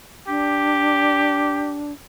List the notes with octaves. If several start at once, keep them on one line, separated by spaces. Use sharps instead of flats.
D4 G4